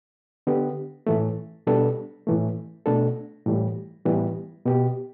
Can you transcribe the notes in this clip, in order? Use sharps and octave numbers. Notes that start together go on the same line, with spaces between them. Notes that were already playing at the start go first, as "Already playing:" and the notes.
D3 B3 G4
A2 E3 A3
B2 G3 B3 D4 A4
A2 E3 A3
B2 A3 D4 A4
A2 E3 G3
A2 E3 G3 B3
B2 B3 G4